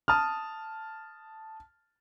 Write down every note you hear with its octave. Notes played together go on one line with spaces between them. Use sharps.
A5 D#6 F6